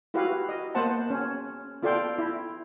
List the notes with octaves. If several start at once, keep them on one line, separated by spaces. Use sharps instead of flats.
E4 F#4 G4 B4 F5
D#5
A#3 B3 B4 C5 F#5 A5
C#4
B3 F4 A4 D5 F5 G5
E4